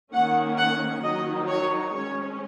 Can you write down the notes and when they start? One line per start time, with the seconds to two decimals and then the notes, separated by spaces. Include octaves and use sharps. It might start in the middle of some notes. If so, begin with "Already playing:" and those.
0.13 D#3 A#3 C#4 F#5
0.58 F#5
1.03 D#3 F#3 D#4 D#5
1.49 C#5
1.94 G#3 C#4 C#5